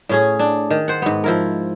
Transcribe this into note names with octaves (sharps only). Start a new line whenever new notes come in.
A2 C#4 G#4
D4
D#3
C5 F#5
G#2 B3
F3 E4 A#4